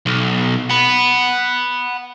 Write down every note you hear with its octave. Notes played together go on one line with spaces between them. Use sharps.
B1
F#5 B5